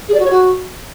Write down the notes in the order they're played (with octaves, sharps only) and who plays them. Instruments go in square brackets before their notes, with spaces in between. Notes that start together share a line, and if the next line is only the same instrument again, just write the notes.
[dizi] G#4
D5
F#4
C#5
F#4